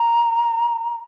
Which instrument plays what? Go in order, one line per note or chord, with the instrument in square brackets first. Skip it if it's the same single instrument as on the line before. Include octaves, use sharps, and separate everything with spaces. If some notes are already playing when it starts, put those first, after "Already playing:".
Already playing: [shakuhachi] A#5